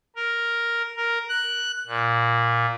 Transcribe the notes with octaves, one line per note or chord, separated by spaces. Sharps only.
A#4
A#4
F#6
A#2